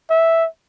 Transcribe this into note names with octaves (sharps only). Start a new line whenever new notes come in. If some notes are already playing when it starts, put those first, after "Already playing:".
E5